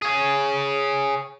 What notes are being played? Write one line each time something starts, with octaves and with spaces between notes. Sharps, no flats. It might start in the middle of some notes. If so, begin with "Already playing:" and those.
G#4 C#5